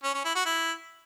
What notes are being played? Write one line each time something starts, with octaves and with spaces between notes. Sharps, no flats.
C#4
C#4
E4
F#4
E4